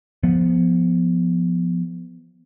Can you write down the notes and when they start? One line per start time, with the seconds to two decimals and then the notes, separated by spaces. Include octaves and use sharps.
0.23 F3 B3